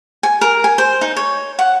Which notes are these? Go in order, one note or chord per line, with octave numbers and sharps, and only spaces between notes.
G#5
A#4
G#5
C5
D#4
C#5
F#5